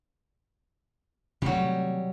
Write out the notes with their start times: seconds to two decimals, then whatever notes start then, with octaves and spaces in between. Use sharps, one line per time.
1.42 C3 D#3 F#3 G3 A3